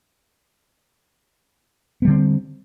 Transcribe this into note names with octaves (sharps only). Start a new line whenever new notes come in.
D3 G3 B3 C4